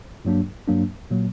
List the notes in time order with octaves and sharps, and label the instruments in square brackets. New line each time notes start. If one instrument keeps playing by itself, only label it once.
[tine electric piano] G2 F#3 A#3 D4
G2 F#3 A#3 D4
A#2 F#3 A#3